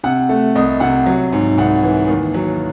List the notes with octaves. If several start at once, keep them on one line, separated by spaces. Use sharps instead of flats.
C3 F#5
A3
C2 D#5
C3 F#5
F#3
G#2
C2 F#5
E3
D#2
F#3